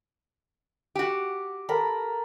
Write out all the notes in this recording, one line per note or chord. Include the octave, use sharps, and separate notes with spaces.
F#4 G4
A4 A#4 B5